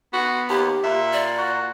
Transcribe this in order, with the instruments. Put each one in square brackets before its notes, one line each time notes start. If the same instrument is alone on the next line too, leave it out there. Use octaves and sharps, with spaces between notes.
[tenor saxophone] B3 [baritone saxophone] F#4
[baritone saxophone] D#2 [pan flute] G4
[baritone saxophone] A#2 [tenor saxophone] E5
[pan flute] D5
[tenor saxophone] F#4